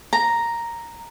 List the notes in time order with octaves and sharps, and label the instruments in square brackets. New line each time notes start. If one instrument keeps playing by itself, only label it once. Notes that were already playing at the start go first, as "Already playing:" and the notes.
[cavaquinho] A#5